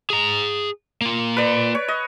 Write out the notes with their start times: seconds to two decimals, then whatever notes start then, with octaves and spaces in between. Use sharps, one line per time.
0.10 G#4 A#5
1.01 A#3 F4
1.37 B4 D5
1.75 C#5
1.88 D#5